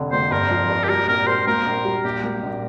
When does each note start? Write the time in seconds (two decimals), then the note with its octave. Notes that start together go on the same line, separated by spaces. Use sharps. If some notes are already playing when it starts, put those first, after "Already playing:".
Already playing: F1 D3
0.12 A#3 C5
0.31 G2 A#4
0.51 F3
0.69 G2
0.84 G4
0.89 G3 A#4
1.08 A#1 A#4
1.27 G3 C5
1.47 A#3 A#4
1.66 A#1
1.85 G3
2.04 A#1 G4
2.24 A#3
2.43 A#1